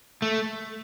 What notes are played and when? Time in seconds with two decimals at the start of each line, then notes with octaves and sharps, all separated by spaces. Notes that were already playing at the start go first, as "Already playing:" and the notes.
0.22 A3